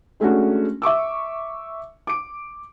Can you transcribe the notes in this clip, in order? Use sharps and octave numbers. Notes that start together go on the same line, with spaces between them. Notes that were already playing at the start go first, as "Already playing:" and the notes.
G#3 A3 C#4 D4 F#4
E5 C#6 D6 E6
D6 D7